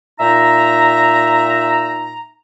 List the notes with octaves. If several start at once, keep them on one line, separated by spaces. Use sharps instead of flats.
A#2 D#4 E5 A#5